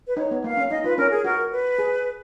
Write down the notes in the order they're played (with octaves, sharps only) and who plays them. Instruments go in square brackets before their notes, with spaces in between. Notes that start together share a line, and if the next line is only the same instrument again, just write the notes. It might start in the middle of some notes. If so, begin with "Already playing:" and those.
[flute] B4
[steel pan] D#4 [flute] C#5
[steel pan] B3
[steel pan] A#3 [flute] F5
[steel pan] C#4
[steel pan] D#4 [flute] D#5
[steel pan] F4 [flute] B4
[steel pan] C#4 [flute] A#4
[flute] G#4
[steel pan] F#4 [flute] A#4
[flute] B4
[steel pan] G#4